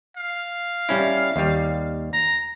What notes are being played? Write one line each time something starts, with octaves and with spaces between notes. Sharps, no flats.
F5
G3 C#4 E4
D#2 G3
A#5